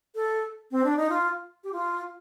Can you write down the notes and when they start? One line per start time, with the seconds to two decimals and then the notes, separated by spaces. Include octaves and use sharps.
0.15 A4
0.71 C4
0.84 D4
0.97 D#4
1.09 F4
1.64 G4
1.73 F4